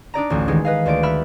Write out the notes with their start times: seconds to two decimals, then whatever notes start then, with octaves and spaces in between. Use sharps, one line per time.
0.14 D4 D#4 D5 A#5
0.30 A1 D2
0.48 D#3 E3 G#3 D#4
0.65 B4 D#5 F5
0.86 D2 F4 D5 D7
1.03 E5 F#5 B5 F6 B6